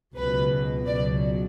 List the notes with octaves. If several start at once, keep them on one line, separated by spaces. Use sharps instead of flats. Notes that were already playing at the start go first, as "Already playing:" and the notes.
C#2 B2 F#3 B4
C#2 B2 F#3 D5